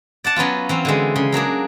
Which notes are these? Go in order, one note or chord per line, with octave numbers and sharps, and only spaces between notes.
D5 F#5 A5
F#3 B3 C#4 F4
E3 C4 F5
D3 E3 G#3
C#3
F#3 A#3 D4 G#4